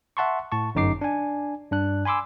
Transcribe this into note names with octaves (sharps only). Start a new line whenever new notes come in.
E5 F#5 A5 C6 C#6
A2 A5 C#6
G1 F#2 D#4 D6 C7
D4 G#5
G2 D4 F#6
G#5 B5 C6 D6 E6